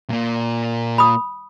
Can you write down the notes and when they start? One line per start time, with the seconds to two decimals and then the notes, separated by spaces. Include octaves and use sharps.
0.10 A#2 A#3
0.98 B5 D#6